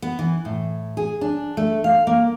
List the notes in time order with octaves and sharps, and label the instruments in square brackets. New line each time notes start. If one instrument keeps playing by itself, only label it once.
[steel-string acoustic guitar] B3
E3
A2
G#4
D4
A3
F5
A#3